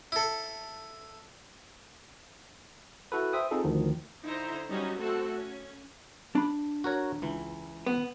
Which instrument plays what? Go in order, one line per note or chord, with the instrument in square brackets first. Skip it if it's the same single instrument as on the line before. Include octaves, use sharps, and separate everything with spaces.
[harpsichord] E4 A4
[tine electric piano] E4 F#4 A4 B4
C5 E5 G5 D#6
C4 D#4 F4 G#4 A4
D2 D#3 F3
[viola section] D3 D#4 E4 C5 A#5
F#3 G3 C#4 D#4 F#4
A3 C4 F#4 A4
C#4
[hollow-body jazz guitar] D4 B5
[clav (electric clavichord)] F#4 A#4 C#5
C#2 E3
[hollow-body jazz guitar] B3